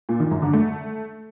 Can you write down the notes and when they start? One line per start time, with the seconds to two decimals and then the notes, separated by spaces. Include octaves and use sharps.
0.09 A#2
0.20 D#3
0.31 F#2
0.42 D3
0.53 A3